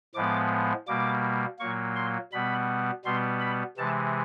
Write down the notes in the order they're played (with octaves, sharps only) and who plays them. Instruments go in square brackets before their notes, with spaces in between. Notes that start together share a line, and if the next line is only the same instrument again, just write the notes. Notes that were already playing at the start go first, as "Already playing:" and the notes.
[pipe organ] A2 F3 G#3 B3 D6
B2 G3 A#3 D6
A#2 F#3 A#3 C#6
C6
B2 G3 B3 B5
B2 G3 B3 C6
B5
C3 E3 G#3 A5